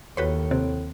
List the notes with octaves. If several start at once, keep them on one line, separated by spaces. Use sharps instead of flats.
D#2 A2 F#4 B4 C#5 B5
C3 C4